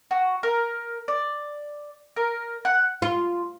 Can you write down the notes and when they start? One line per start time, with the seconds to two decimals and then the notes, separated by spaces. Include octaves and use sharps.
0.11 F#4
0.43 A#4
1.08 D5
2.17 A#4
2.65 F#5
3.02 F4